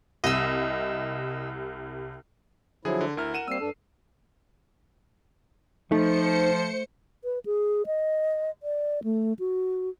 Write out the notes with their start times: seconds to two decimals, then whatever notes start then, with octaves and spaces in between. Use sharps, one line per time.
0.24 C2 C3 D#5 E6
2.85 D3 F3 F#3 E4 G#4 G#5
3.01 D3
3.17 D2 E4 A#4 F6
3.34 F#5 D#7 E7
3.48 G3 A#3 C4 E6 C7
3.60 G2 D4 A4
5.92 F3 A3 D#4 C5 C#7
7.24 B4
7.46 G#4
7.86 D#5
8.63 D5
9.04 A3
9.39 F#4